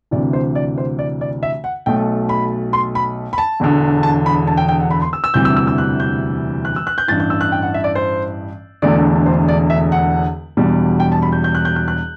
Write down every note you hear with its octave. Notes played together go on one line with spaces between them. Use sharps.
D2 C3 E3 D5
C5
D5
C5
D5
D5
E5
F#5
B1 B2 A3 G5
B5
C6
B5
B5
A5
E1 E2 D3
A5
B5
A5
G5
G5
F#5
B5
C6
E6
E6
E1 D2 C3 E3 G3 G6
E6
E6
E6
F#6
G6
F#6
E6
F#6
G6
A1 G2 E3 A6
G6
E6
F#6
G5
F#5
E5
D5
C5
E1 E2 D3 A3 D5
C5
D5
E5
F#5
E1 E2 B2 G3
G5
A5
B5
G6
G6
F#6
G6
F#6
F#6